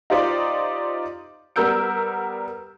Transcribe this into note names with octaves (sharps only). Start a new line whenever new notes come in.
D#4 F4 G4 C5 D5
G3 B3 A#4 E6 G6 D7